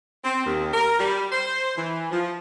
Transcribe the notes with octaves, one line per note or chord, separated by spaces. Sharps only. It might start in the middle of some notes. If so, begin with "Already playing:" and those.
C4
D#2
A#4
G3
C5
E3
F3